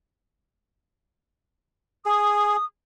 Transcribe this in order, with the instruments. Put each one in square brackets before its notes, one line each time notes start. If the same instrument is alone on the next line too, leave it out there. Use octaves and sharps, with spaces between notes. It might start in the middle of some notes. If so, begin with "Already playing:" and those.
[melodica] G#4 [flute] D#6